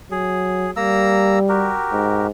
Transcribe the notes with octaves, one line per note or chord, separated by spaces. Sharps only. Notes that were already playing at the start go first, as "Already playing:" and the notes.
F#3 G#4
G3 A#3 A#5 E6
F#4 G4 A#4
G#2